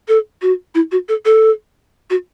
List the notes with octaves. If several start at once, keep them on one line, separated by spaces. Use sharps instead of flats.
A4
F#4
E4
F#4
A4
A4
F#4